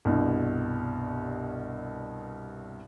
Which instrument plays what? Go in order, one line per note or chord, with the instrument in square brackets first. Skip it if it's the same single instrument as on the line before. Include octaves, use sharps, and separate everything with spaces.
[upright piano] C2 G2 B2